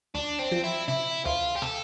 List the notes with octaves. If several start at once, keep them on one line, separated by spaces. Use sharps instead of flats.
D2 D4
C4
F3
E4
C3 E4
D2 F4
G4
C3 A4